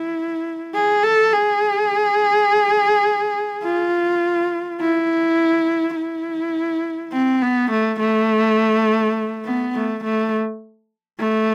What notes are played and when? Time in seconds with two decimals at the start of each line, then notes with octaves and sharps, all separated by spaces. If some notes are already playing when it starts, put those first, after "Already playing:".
Already playing: E4
0.74 G#4
1.03 A4
1.33 G#4
3.64 F4
4.81 E4
5.96 E4
7.13 C4
7.42 B3
7.71 A3
8.00 A3
9.45 B3
9.75 A3
10.04 A3
11.19 A3